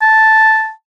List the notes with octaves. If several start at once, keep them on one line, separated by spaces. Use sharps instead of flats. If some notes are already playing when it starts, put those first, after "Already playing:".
A5